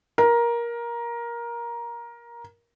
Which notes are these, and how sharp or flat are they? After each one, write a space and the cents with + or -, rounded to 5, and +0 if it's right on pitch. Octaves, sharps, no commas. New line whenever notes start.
A#4 +15